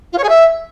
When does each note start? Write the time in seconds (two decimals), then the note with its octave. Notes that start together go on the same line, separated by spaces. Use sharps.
0.13 F4
0.18 C#5
0.23 G#4
0.29 E5